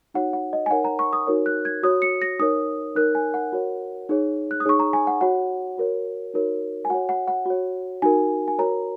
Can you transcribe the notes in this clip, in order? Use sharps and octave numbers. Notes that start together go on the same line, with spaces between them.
D#4 F#4 C#5 F#5
F#5
D#5
G#5
D#4 A#4 C#5 F#5
A#5
C#6
D#6
D#4 F#4 A#4 C#5
F#6
G#6
F#4 C#5 D#6
C#7
A#6
D#4 A#4 C#5 D#6
D#4 A#4 C#5 F#6
G#5
F#5
F#4 A#4 C#5
D#4 G#4 C#5
F#6
D#6
D#4 G#4 C#5 C#6
A#5
G#5
F#5
F#4 C#5 F#5
F#4 A#4 C#5
D#4 F#4 A#4 C#5
G#5
F#4 C#5 F#5
F#5
F#5
F#4 C#5
D#4 F#4 A#4 G#5
G#5
F#4 A#4 C#5 A#5